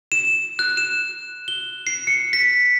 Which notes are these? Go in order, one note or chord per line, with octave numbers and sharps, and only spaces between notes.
E7
F#6
E7
G7
C7
C#7
B6